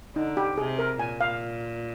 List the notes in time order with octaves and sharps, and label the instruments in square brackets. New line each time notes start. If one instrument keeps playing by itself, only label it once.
[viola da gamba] D3 [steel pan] D#4
[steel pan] G4
[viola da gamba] C3 [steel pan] G#4
[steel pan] A#4
[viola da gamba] A#2 [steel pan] G#5
[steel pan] F5